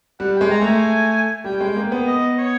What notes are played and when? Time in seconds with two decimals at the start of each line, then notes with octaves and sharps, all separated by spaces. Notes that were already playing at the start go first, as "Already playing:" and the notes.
0.19 G3 F#5
0.35 G5
0.41 G#3
0.51 A#5
0.61 A3 G#5
1.44 G3 G5
1.61 G#3
1.76 A#3
1.92 B3
2.07 D#5
2.39 C#5